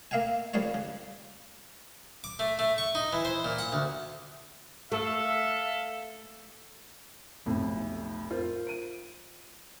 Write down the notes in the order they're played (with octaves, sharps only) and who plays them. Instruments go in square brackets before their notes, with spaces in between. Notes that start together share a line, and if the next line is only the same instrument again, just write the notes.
[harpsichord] A#3 E5 F5 G5 G#5
C2 G3 F4 C5 C#5
C#3
D6
A3
A3
C#6
D#4
E3
C5
A#2
F#5
D2
[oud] A3 [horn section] A4 E5 F5
[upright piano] F1 B1 F2 A2
F4 A#4 C5
D7 D#7